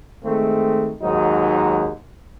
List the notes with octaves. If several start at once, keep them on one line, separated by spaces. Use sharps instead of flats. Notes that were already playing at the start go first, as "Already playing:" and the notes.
D#3 G#3 A3 C4
D#2 G#2 F#3 D#4